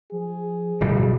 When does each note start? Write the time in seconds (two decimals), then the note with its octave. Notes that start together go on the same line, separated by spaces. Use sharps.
0.12 F3 G#4
0.80 D1 G1 B2 G3